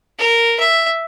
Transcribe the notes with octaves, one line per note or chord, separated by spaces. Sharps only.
A#4
E5